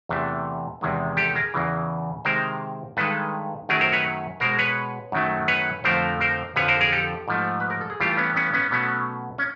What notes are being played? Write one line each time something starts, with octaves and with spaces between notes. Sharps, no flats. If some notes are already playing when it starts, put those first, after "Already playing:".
E2 C3 E3 A3
E2 C3 D#3 G#3
G4 A4
G#4 A#4
E2 C#3 E3
C3 D#3 G#3 A#4 C5
G2 D#3 G#3 A4 B4
F#2 D#3 F#3 A3 G#4 A#4
A#4 C5
B4 C#5
B2 G#3 A#4 C5
B4 C#5
F#2 D#3 F#3 A3
B4 C#5
F2 D3 F3 A3 A#4 C5
A#4 C5
F2 D3 F3 B4 C#5
A#4 C5
G#4 A#4
G4 A4
G#2 F3 A3
B4
A#4
A4
G#4
G2 E3 A3 F4 G4
B3 C#4
B3 C#4
B3 C#4
B2 F#3 A3 B3 C#4
C#4